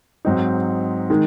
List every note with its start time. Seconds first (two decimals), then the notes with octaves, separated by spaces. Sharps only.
0.25 G#2 F#3 C4 D#4
1.10 D#3 G#3 D#4